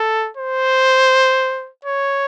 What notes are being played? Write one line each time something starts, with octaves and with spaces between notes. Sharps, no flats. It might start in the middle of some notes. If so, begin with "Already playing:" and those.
Already playing: A4
C5
C#5